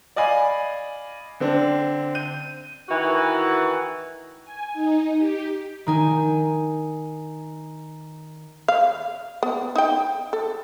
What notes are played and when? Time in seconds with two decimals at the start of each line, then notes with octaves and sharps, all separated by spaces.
0.16 D5 D#5 F5 G#5 B5
1.40 D3 C4 D4
2.15 G6 D#7
2.89 D#3 E3 F#4
4.45 G#5
4.74 D#4
5.18 G4
5.87 D#3 D#4 G#5
8.68 F5
9.43 B3
9.76 D#4 G5
10.33 A4